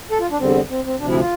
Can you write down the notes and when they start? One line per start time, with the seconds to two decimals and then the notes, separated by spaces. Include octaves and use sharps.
0.11 A4
0.20 F4
0.31 D4
0.39 E2 D3 G3 C4
0.70 C4
0.85 C4
0.99 D2 C3 F3 D4
1.09 E4
1.19 F4